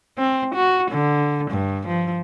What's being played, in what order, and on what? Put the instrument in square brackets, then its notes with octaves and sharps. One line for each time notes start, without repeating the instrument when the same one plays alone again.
[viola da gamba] C4
F#4
D3
G2
F3